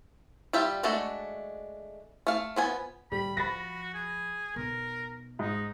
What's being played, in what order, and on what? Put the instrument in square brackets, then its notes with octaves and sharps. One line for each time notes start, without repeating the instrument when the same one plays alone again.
[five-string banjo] G3 F4 G4 E5
G#3 A3 D4 F#4 A4
A3 F5
F3 B3 G#5
[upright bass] A2 D#3 [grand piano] G3 [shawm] B5
[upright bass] F3 [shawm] F#4 [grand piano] B5 A6 A#6
[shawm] G#4
[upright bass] B1 [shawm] A#4
[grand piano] G#2 [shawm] D#4